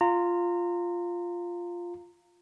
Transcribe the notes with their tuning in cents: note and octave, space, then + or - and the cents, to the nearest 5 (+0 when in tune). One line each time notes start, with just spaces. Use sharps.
F4 +0 A#5 -25